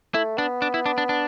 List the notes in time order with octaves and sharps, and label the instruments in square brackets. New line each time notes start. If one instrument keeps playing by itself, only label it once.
[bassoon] A3 [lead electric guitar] E4
[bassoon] B3 [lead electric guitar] D4
[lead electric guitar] D4
E4
D4
D4
D4